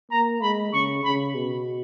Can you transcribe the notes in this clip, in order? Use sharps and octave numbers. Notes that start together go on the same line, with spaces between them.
A#3 A#5
G#3 B5
C#3 C#6
C#3 B5
B2